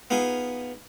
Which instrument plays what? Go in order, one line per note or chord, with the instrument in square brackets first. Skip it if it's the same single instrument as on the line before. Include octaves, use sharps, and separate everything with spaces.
[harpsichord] B3 D#4 F4 G#4